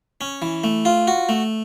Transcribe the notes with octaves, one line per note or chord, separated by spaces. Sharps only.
C#4
E3
A3
F4
F#4
A3